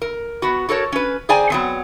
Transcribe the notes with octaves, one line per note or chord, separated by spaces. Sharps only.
A#4
B3 F#4
F#4 A4 A#4 C#5
C#4 B4
G#4 C5 D5 G5 G#5 A#5
F#3 B3 C4